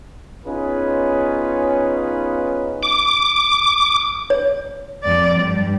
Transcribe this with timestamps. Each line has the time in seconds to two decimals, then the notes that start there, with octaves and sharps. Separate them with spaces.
0.46 B3 C#4 D#4 F4 G#4 B4
2.83 D6
4.30 C#5
5.03 F2 D5
5.38 G2 G3